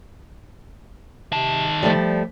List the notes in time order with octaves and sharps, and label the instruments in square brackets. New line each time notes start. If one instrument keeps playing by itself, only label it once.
[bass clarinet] C3 [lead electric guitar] D#3 A5
[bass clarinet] F3 [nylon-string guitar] G3 A3 D5